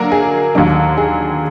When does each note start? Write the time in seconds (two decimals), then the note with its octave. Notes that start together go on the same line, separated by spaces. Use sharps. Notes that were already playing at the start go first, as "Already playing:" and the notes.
Already playing: D3 F#3 A#3 D4 A#4
0.12 G#4
0.55 D#2 D3 F#3 D4
0.97 G#4